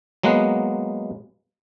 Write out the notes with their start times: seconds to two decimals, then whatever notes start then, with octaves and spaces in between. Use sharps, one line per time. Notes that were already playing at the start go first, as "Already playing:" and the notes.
0.23 F#3 G#3 A#3 B3 F#5